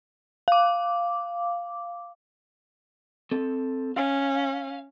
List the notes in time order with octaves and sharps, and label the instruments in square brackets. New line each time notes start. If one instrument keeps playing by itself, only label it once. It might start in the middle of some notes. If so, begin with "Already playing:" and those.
[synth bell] F5 D6
[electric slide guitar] C4 A4
[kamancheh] C#4 [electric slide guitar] F5